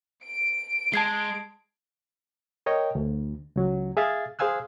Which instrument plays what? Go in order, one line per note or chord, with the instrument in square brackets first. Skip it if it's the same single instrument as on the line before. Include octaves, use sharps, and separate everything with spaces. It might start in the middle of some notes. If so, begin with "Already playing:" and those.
[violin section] D7
[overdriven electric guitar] G#3 [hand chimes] A5 G#6 C7
[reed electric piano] A#4 C#5 D#5 G5
D2
C#2 F#3
G#4 E5 F5 A6
G#4 C5 F5 G#5 E6 F#6